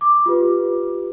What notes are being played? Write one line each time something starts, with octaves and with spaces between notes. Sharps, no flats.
D6
F4 G4 B4